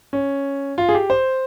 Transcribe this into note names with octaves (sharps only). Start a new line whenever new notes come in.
C#4
F4
G#4
G4
C5